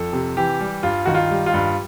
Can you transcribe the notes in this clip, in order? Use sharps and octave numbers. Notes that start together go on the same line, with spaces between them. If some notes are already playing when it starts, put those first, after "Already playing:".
Already playing: F2 A4
C3
E3 G4
G3
G2 F4
D#3 F#4
F4
G3
F4
G2